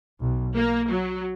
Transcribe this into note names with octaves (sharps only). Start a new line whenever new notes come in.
B1
A#3
F#3